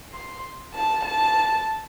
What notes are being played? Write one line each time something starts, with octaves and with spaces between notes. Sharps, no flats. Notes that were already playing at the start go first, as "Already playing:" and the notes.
C6
A5
A5